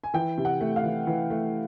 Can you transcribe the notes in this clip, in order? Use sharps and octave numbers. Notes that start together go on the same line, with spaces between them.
G#5
E3 G5
C3
F#5
A3
F5
E3
E3
A3